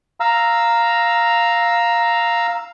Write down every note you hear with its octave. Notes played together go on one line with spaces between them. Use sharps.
F5 A#5 E6